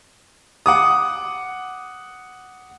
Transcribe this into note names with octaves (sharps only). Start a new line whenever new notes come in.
F#5 D6 D#6